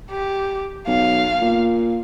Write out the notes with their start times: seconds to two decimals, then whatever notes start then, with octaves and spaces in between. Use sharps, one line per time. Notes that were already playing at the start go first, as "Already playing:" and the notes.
0.11 G4
0.87 B1 F5
1.41 A#2